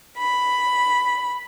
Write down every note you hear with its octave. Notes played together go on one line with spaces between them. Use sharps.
B5